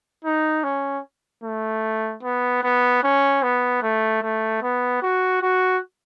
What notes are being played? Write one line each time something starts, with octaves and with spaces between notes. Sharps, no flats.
D#4
C#4
A3
B3
B3
C#4
B3
A3
A3
B3
F#4
F#4